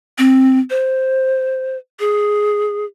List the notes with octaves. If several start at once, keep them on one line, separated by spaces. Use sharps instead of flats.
C4
C5
G#4